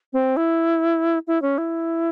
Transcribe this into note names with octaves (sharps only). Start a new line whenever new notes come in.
C4
E4
E4
C#4
E4